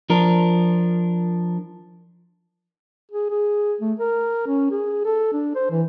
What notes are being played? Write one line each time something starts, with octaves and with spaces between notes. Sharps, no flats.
F3 D4 A#4
G#4
G#4
A3
A#4
C#4
G#4
A4
D4
C5
E3